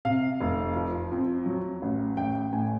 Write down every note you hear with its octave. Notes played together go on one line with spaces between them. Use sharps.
C3 F5
F1
F3
F2
F#3
A1
A1 G5
A2 G#5